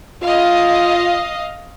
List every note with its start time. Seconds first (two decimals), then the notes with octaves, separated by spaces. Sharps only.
0.23 F4 D#5 F5